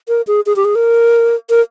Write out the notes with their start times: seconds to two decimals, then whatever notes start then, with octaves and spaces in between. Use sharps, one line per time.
0.08 A#4
0.27 G#4
0.46 G#4
0.56 G4
0.65 G#4
0.75 A#4
1.50 A#4